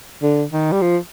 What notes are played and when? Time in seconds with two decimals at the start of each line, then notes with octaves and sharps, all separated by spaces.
0.23 D3
0.52 D#3
0.72 G3
0.81 F3